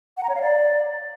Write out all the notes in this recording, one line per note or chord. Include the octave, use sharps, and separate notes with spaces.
F#5
A#5
C#5
F5
D5